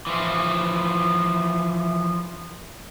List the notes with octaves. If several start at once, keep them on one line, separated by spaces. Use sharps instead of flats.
E3 F3 E4